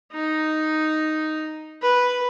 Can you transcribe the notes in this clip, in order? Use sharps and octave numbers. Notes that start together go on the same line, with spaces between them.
D#4
B4